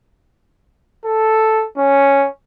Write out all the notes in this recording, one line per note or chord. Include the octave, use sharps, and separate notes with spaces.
A4
C#4